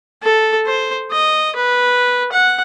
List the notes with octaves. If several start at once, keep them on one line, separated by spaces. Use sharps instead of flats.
A4
C5
D#5
B4
F#5